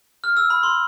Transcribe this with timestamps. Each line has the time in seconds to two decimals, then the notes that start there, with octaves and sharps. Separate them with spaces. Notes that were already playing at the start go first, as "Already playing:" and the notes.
0.24 F6
0.37 E6
0.50 B5
0.63 C6